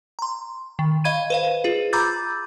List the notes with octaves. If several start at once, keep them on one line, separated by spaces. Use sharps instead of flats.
A#5 C6
D#3
D#5 F5 B5 G#6 D#7
B4 C5 F5
F4 G#4
A#5 B5 D6 E6 G6 A6